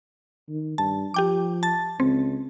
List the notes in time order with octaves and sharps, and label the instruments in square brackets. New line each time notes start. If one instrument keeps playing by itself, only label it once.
[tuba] D#3
[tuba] G2 [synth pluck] A5
[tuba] F3 [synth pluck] G4 G5 D6
[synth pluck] A5 A6
[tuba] C#2 [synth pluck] C4